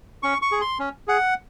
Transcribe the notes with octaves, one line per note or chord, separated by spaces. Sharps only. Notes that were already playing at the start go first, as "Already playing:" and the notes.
C#4 C#6
C#6
G#4
C6
C#4
G#4 F#5